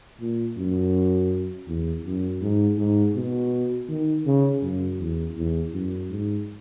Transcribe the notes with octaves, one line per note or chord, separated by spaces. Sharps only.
A#2
F#2
E2
F#2
G#2
G#2
B2
D#3
C#3
F#2
E2
E2
F#2
G#2